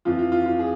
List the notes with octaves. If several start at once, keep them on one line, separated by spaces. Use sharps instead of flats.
F2 E3 F4
F4
F4
F4
G#4